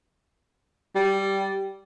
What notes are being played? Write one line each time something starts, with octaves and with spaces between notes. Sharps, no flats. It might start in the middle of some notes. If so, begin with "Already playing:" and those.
G3